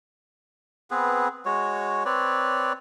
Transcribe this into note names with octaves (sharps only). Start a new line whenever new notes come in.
B3 C4 G#4 B4
G#3 F#4 C#5
C4 B4 C#5 D5